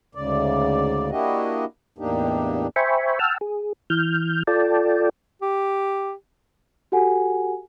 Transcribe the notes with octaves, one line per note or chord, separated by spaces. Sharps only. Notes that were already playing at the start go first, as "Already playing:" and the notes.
D2 G#2 C#3 D5
A#3 D4 E4 F#4 G4 D#5
E2 A2 A#3 D4 D#4 G4
C5 E5 G5 G#5 B5 C#6
F#5 G5 A5 E6 F6
G#4
E3 F6 G6
F4 A4 D5 G5 A5
G4
F#4 G4 A4 F#5 G#5